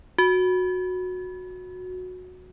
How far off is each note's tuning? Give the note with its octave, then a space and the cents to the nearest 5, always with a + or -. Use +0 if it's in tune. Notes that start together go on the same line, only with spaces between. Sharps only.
F#4 -15